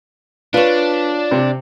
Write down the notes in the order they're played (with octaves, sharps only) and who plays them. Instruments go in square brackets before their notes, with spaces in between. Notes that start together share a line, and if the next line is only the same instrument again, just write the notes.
[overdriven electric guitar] D4 [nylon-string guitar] F4 C#5 [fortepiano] B4
[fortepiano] C3